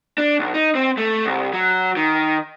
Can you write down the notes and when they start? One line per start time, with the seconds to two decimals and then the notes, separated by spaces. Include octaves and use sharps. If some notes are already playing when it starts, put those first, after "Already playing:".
0.18 D4
0.39 B1
0.54 D#4
0.75 C4
0.97 A3
1.26 C2
1.53 F#3
1.97 D#3